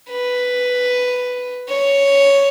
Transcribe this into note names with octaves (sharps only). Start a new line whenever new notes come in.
B4
C#5